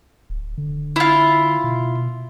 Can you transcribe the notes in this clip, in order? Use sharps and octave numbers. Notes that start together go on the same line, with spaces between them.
D1
D3
E4 F4
B2